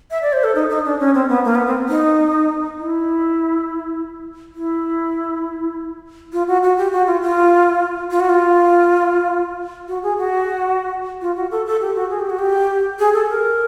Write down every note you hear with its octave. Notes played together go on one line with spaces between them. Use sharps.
E5
D5
C5
A4
D#4
D#4
D4
C#4
C4
B3
A#3
B3
C4
D#4
E4
E4
F4
F#4
F#4
G4
F#4
F4
F4
F4
F#4
F4
F#4
G#4
F#4
F4
F#4
A4
A4
G4
F#4
G#4
G4
F#4
G4
G#4
A4
A#4